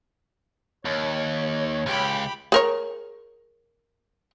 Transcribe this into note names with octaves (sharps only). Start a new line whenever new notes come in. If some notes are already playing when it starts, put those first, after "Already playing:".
D#2 C#5
C#2 G4 B5
G#4 A#4 C#5